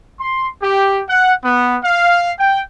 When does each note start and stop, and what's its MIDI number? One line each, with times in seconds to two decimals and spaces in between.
0.20 0.48 84
0.62 1.01 67
1.09 1.34 78
1.44 1.77 59
1.84 2.32 77
2.39 2.62 79